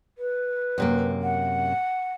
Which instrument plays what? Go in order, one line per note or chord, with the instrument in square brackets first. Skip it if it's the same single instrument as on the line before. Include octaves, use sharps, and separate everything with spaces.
[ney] B4
[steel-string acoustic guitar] F#2 C3 A#3
[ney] F#5